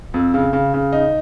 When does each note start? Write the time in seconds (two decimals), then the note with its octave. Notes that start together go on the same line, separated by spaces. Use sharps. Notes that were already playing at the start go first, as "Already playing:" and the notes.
0.14 F2
0.34 C#3
0.53 C#3
0.74 C#3
0.93 D#4